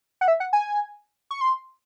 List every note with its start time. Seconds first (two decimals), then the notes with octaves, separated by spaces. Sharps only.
0.21 F#5
0.28 E5
0.40 F#5
0.53 G#5
1.31 C#6
1.41 C6